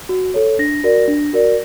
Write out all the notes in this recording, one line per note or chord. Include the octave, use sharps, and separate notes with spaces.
F#4
A4 C#5
D4 A#6
F#4 A#4 D5
D4
F#4 A#4 D5